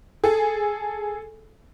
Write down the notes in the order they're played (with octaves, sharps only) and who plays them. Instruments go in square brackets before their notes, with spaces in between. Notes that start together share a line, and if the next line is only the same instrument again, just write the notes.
[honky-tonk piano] G#4 A4